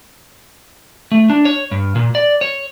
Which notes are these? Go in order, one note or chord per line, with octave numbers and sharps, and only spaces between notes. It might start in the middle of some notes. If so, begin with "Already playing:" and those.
A3
D4
C#5
G2
A#2
D5
C#5